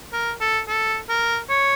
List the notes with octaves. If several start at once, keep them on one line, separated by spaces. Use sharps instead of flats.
A#4
A4
A4
A#4
C#5